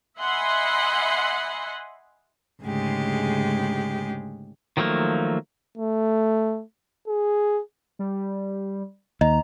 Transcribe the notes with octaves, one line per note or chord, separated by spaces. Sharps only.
D#5 E5 F#5 G#5 B5 C6
D2 G#2 C#3 G#3 G4 G#4
D#3 F3 F#3 A3 A#3
A3
G#4
G3
D#2 D#5 A#5